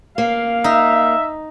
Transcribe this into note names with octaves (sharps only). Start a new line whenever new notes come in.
A#3 F5
D#4 E5